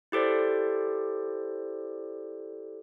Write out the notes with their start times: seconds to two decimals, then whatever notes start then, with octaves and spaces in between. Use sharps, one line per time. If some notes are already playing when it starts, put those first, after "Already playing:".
0.12 E4 G4 A4 C5 D5